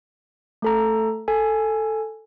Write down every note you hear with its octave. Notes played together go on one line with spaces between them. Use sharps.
A3 A4 A#5
A4 G#5